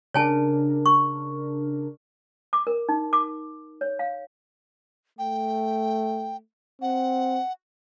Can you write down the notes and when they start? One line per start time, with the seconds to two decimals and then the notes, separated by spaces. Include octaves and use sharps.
0.14 C#3 D4 A#4 C#5 G#5 A5
0.86 C#6
2.53 D6
2.67 A#4
2.89 D#4
3.13 D6
3.81 C#5
3.99 F5
5.19 A3 G5
6.82 C4 F#5